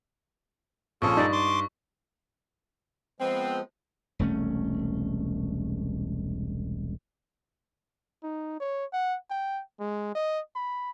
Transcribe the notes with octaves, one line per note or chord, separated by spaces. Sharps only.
A#1 F3 C#4 F4 G#4 A4 C#6
G2 D#4 D5
C6 D6
F3 G#3 B3 C4
E1 C2 A3 C#4
D#4
C#5
F#5
G5
G#3
D#5
B5